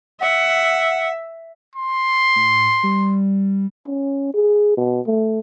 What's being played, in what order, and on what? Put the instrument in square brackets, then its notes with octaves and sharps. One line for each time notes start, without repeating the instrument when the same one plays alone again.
[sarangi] E5 [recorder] F#5
[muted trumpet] C6
[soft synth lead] A2
G3
[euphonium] C#4
G#4
B2
A3